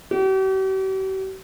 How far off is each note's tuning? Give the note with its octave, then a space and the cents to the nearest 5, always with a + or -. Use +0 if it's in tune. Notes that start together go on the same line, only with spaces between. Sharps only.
G4 -45